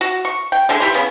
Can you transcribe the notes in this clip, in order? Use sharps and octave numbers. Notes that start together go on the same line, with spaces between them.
F#4
C#6
G5
D3 G#3 A4
E3 G4 C6
C#3 B3